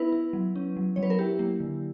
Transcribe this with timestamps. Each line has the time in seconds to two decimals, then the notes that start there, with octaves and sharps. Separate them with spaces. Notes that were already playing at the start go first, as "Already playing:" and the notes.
Already playing: B3 E4 B4
0.12 E4
0.33 F#3
0.56 C#4
0.77 F#3
0.96 F#3 C#5
1.03 B4
1.10 A#4
1.19 E4 G4
1.39 A#3
1.60 D3